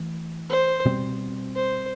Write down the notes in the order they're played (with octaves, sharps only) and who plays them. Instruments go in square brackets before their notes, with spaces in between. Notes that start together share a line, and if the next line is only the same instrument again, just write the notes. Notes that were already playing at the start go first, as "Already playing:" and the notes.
Already playing: [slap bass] E3 A3
[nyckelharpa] C5
[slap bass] B2 G3 C4
[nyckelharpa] C5